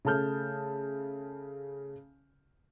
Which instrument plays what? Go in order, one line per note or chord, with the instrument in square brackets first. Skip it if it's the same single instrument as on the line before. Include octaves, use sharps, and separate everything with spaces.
[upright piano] C#3 A3 A5 F6 G6